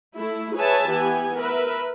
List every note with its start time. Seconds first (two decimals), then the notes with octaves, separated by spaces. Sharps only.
0.16 A3 E4
0.56 G#4 B4 C#5 E5 G#5 A5
0.89 E3 B3 G4 G#5
1.37 A#4 B4 E5